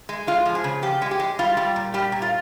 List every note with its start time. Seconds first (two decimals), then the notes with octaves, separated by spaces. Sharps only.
0.09 G#3
0.27 G#3 F4
0.45 F3
0.55 G#4
0.64 C#3
0.82 F3 G4
1.02 G#3
1.11 G4
1.20 G#3
1.39 G3 F4
1.57 G3
1.76 A#2
1.94 G3 G4
2.12 A#2
2.22 F4